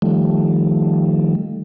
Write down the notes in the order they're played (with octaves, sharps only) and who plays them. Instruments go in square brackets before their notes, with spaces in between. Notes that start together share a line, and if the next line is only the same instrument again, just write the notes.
[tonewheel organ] D#3 F3 G3 A3